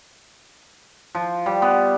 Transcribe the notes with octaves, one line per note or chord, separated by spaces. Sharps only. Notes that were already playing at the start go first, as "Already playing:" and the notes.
F3
G3
B3